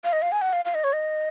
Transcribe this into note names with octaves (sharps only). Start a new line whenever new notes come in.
F5
D#5
F5
G#5
F#5
F5
F5
D#5
C#5
D#5